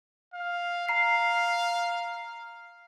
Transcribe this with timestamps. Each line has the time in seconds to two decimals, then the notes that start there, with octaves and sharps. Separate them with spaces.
0.34 F5
0.89 F5 A#5 C7